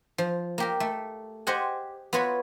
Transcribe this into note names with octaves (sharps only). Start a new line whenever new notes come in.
F3
A#3 G4 A#4
A3
G4 C5 D#5 F#5 G#5
B3 F4 F#4 B4 C#5 B5